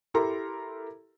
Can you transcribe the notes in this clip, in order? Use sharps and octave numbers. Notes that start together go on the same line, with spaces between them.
E4 G4 A4 A#4 A#5 C6